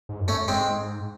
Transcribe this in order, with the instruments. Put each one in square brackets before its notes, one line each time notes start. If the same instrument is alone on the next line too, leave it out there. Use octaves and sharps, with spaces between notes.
[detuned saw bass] G#2
F#2
[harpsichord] A3 C#4
[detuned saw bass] G#2
[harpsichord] G#3 C4